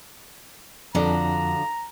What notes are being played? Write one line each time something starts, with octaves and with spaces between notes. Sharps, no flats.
F2 D3 F3 D4 F#4 A#5